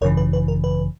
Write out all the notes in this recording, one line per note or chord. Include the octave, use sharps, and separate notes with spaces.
G#1 F#2 C#3 E3 A#4 C#5
B4
B4
A#4
B4